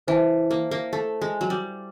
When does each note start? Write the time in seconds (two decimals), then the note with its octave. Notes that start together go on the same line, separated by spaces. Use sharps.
0.08 E3 C5 E5 A5
0.51 A#3
0.71 A#3
0.93 A3
1.22 G#3
1.41 F#3
1.50 G3